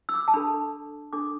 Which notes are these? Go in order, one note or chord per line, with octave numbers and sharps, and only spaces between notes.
E6
D6
A5
D4 A4 B5
D4 A4 D6